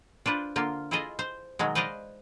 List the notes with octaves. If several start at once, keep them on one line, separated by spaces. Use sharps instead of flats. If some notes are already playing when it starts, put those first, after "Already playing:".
D4 F4 B4 C5
D3 A#3 F4
E4 F4 G#4 A4 D#5
C5
B2 D#3 F#3 G#3
B4 C5 D5 D#5 F5